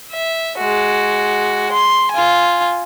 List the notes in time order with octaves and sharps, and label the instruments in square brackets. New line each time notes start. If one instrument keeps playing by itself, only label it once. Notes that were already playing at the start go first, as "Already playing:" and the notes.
[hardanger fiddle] E5
G#3 F#4
C6
F4 G#5